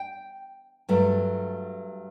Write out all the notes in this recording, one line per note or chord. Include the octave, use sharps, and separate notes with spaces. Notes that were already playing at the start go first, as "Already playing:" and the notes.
Already playing: G5
G2 F#3 A3